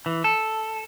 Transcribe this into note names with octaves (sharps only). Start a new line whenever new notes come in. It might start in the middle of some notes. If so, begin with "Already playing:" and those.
E3
A4